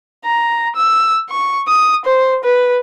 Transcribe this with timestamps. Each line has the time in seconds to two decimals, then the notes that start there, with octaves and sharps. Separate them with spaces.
0.26 A#5
0.76 E6
1.30 C#6
1.68 D#6
2.05 C5
2.44 B4